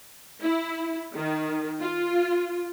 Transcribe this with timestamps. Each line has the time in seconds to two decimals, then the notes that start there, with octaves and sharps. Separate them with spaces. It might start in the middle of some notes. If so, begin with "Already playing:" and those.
0.40 E4
1.14 D#3
1.79 F4